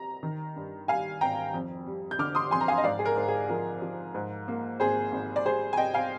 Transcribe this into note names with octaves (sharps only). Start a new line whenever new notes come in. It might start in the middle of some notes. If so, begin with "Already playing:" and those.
Already playing: C3 A#5
D#3
G2
G3 F5 G#5
G#1 G5 A#5
F2
G3
G6
D3 D6 F6
C6 D#6
F2 G#5 C6
A#5
F5 G#5
D#5
G#2 D5 F5
G#4
A#4
G#2
G#4
F3 A#4
F3
G#2
A#3
G#1 G#4 C5
G#1
D5
G3 G#4 C5
G#5
C3 D#5 G5
F5 G#5